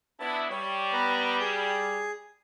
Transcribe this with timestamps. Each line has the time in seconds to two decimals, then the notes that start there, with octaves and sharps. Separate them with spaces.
0.20 B3 D4 E4 A5
0.50 G3 C#5
0.93 B3 B4 A#5
1.40 G#4